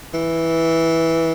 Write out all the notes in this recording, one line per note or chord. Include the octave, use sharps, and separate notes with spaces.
E3